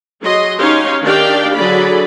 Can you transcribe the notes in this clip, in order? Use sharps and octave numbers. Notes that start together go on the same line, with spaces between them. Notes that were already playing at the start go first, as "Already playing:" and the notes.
F#3 G#4 D#5 C6
C#4 D#4 G4 C#5 F5 C6
D#3 D4 G4 D5 F5 G5
D3 F#3 G#4 D5 B5